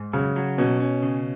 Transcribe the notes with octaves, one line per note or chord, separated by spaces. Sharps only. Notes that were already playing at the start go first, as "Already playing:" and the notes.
Already playing: G#2
C#3 F#3
F#3
B2 C#4
C#4
C#3